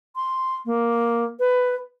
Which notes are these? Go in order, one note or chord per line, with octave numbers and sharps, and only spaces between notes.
C6
A#3
B4